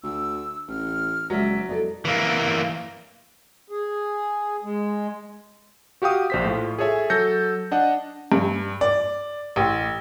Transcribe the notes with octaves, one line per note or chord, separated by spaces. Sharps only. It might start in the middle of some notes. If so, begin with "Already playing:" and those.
D2 E6
A1 F6
F#1 F#3 G#3 D5 E5
B2 E4 A4 D5 D#5
E3 A#3
G#4
G#3
F#4 G4 F5 G5 D#6
A#1 C5 B6
A2 F4
G#4 A4 C#5 E5 G#5
F#3 A4 G6 A#6 C#7
D4 D#5 F#5
G2
D5
A1